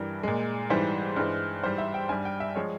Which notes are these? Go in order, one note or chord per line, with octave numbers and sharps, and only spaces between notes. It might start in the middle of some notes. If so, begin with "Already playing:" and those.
Already playing: G2 E3 G3 A#4
A#2 G#3
G#2 E3 G3 C5
G2 E3 G#3
G#2 E3 G3 C5
E5
G5
G2 G3 G#5
G5
E5
F3 G#3 C#5